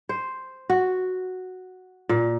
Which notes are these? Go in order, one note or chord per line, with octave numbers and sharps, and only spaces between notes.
C5
F#4
A#2